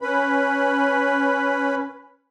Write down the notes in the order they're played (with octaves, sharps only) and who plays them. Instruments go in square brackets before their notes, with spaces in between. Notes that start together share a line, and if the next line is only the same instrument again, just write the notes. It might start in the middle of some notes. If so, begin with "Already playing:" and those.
[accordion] C#4 B4 B5